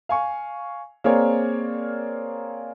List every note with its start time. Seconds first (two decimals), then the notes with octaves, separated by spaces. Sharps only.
0.09 F5 G#5 C#6
1.04 A#3 C4 G#4 A#4 C#5 D5